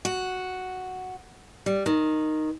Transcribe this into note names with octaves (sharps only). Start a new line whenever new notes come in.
F#4
G3
D#3